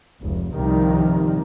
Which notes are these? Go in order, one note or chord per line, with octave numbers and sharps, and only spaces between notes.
F1 C#2
C2 G2 C3 D#3 F3 G3